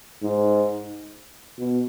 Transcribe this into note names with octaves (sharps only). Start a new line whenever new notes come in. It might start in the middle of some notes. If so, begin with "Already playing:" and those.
G#2
B2